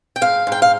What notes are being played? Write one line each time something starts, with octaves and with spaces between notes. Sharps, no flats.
G5
G#2 F5
G#2
G5
F5